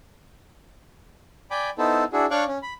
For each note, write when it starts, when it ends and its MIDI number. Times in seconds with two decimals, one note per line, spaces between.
1.51 1.70 74
1.51 1.70 79
1.51 1.70 80
1.51 1.70 83
1.51 1.70 86
1.78 2.04 59
1.78 2.04 63
1.78 2.04 64
1.78 2.04 69
1.78 2.04 72
2.13 2.26 62
2.13 2.26 64
2.13 2.26 66
2.13 2.26 68
2.31 2.44 62
2.31 2.44 73
2.31 2.44 77
2.31 2.44 85
2.31 2.44 86
2.31 2.44 90
2.48 2.58 61
2.62 2.73 83